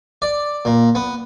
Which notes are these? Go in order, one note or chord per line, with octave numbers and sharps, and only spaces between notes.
D5
A#2
B3